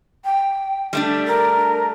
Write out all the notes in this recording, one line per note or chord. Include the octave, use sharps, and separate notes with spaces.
G5
G3 A3 D4
A#4